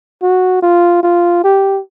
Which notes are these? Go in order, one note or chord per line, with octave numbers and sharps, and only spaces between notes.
F#4
F4
F4
G4